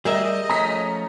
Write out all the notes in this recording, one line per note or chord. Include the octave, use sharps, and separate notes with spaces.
G3 G#4 A#4 D#5 E5
F3 A3 C#4 A#5 D#6 B6